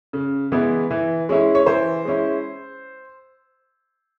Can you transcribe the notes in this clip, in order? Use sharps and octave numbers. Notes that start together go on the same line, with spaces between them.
C#3
E3 G#3 B3 E4
E3
G#3 C#4 E4
C#5
E3 C5
G#3 C#4 E4